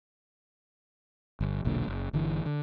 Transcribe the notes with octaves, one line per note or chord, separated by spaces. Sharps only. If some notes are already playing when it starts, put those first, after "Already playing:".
G1
E1 B1 A#2 D3
F#1
G1 D3 E3
D3